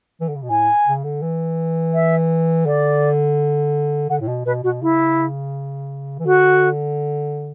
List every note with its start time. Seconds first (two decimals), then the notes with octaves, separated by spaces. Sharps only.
0.21 E3
0.29 D3
0.35 C#3
0.43 B2
0.50 A2 G#5
0.86 C#3
1.04 D3
1.22 E3
1.94 E5
2.66 D3 D5
4.10 D3 F#5
4.21 A2
4.28 B2
4.46 B2 B4
4.63 B2 F#4
4.82 C#3 E4
6.19 E3
6.26 D3 F#4